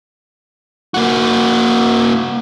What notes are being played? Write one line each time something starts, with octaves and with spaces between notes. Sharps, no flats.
A#3 F#4